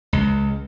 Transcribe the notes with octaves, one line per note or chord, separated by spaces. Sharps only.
C#2